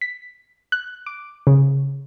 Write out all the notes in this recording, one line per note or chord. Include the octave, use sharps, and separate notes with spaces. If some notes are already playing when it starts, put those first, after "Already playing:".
B6
F#6
D6
C#3